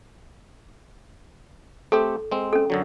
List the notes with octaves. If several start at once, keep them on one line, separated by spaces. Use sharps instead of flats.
A3 C4 G4 A4
G#3 C4
C#4 A4
F#2 D3 F#3